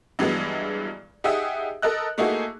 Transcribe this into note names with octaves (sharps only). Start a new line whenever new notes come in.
G2 E3 F#3 G#3 B3
D#4 G4 G#4 E5 F#5 D#6
A4 A#4 D#5 F#6
A3 A#3 D#4 E4 F#4 G#4